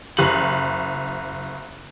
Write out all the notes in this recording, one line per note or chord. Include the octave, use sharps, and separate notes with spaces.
F#1 F#7